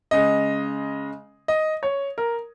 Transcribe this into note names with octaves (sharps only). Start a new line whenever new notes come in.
C#3 G#3 D#5
D#5
C#5
A#4